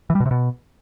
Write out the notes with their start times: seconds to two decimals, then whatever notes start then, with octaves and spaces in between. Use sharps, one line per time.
0.10 E3
0.15 G3
0.20 B2
0.26 C3
0.31 B2